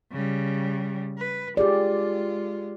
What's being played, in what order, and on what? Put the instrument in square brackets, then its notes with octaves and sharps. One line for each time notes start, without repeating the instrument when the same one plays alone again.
[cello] C#3 G3
B4
[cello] G#3 F4 [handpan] G4 G#4 D5